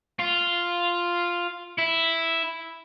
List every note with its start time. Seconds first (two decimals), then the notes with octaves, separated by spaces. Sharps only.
0.19 F4
1.78 E4